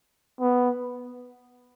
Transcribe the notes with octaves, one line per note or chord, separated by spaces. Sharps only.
B3